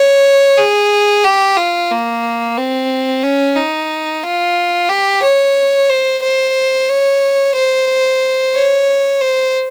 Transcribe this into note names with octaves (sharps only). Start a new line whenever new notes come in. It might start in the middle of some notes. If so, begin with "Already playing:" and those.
Already playing: C#5
G#4
G4
F4
A#3
C4
C#4
D#4
F4
G4
C#5
C5
C5
C#5
C5
C#5
C5